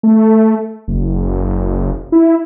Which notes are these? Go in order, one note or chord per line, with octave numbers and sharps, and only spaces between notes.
A3
F#1
E4